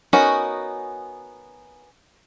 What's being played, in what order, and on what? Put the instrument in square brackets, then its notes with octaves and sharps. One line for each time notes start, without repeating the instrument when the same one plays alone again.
[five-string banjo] B3 C#4 D#4 F#4 A#4